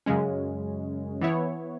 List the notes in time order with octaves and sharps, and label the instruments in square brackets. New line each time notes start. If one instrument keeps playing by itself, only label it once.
[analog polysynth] F#2 C#3 G#3 C#4
E3 B3 E4 C#5